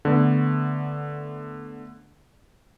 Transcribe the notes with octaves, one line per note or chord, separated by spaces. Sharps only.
D3 A3 B3